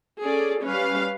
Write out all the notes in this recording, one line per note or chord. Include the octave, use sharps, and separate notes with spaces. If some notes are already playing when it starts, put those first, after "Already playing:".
C#4 G#4 A4 D5
G3 C#4 B4 F5